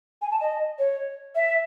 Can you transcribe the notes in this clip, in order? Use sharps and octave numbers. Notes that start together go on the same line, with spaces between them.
G#5
A5
D#5
C#5
E5